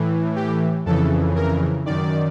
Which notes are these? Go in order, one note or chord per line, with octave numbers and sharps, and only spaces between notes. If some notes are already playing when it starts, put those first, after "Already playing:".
Already playing: A2 E3
G4
F2 C#3 E3 A4
A#4
F#2 D#3 D5